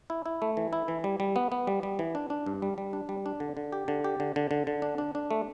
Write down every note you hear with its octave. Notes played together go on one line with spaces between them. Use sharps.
E4
E4
A3
E3
E4
E3
G3
G3
B3
B3
G3
G3
E3
D4
D4
G2
G3
G3
D4
G3
D4
D3
D3
G4
D3
G4
D3
D3
D3
D3
D4
D4
D4
A3